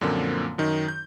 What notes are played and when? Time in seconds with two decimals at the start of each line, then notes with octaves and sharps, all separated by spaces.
0.01 F#2 A#2 D3 F3 A#3 C4
0.58 F#2 D#3 D#4
0.88 G6